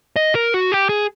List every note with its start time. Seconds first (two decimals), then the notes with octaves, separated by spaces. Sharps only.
0.16 D#5
0.35 A#4
0.54 F#4
0.72 G4
0.89 G#4